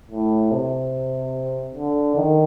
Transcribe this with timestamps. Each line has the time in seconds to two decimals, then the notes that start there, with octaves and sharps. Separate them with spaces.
0.10 A2
0.51 C3
1.75 D3
2.16 D#3